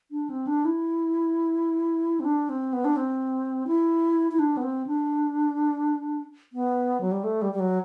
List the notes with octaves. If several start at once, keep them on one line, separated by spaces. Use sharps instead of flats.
D4
C4
D4
E4
C4
D4
C4
B3
D4
C4
E4
E4
D4
B3
C4
D4
B3
F#3
G3
A3
G3
G3
F#3